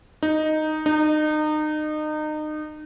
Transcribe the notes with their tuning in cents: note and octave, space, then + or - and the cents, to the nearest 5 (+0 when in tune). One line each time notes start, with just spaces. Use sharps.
D#4 -5
D#4 -30